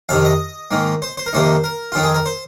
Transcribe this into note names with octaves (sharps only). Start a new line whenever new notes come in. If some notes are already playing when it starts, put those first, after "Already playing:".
F2 C3 D#3 F5
D#5
G#2 D#3 A#3
C5
C5
A#4
F2 C3 D#3 A#3 D#4 C5
A#4
F2 D#3 C4 D#4 F4
G#4
A#4
C5